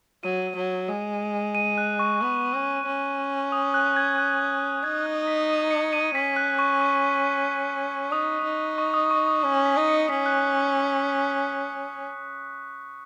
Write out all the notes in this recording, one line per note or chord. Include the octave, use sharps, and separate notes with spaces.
F#3 D#7
F#3
G#3
D#7
F#6
C#6
B3
C#4
C#4
D#6
F#6
G#6
F#6
D#4 G#6
F#6
B6
D#7
C#7
D#7
C#4 B6
F#6
C#6
C#6
D#4 D#6
D#4
C#6
D#6
C#6
D#6
C#4
B6
D#4
C#7
C#4 B6
F#6